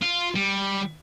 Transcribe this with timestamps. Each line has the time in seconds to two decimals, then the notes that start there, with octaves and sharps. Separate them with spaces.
0.01 F4
0.35 G3